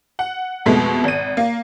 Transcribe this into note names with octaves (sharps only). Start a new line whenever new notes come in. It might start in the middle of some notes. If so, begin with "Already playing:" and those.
F#5
F2 B2 G#3 A3
G#1 D#7
A#3